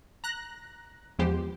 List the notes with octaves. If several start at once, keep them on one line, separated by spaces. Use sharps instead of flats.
A#5 F#6 A#6
E2 F3 G#3 B3 G4 C5